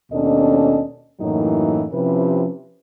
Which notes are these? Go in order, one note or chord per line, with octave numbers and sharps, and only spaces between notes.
D#2 B2 C#4 D4 A4 D#5
F#2 A2 E3 F#3 A#3 D#4
C3 F3 C#4 E4 G4 B4